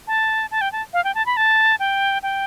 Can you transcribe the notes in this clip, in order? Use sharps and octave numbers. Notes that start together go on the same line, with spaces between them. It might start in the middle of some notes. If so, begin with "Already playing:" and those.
A5
A5
G5
A5
F5
G5
A5
B5
A5
G5
G5